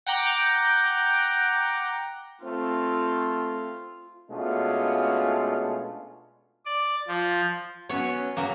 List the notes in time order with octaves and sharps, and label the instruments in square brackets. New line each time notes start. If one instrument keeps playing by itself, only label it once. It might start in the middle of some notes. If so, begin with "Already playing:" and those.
[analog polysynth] F#5 G5 A#5 D6
[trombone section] A3 C4 [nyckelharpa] F4
[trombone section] B2 G#3 A3 C#4 D4 F4
[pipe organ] D5
F3
[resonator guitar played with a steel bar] F#3 B3 C#4 [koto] C#5
[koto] C#3 F#3 A#3